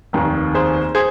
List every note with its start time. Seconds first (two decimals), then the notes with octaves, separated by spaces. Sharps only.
0.13 F1 D#2 D#3
0.54 G#4 C5
0.95 G#4 C5